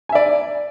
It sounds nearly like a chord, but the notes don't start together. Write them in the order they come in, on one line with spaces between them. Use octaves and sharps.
G#5 E5 D5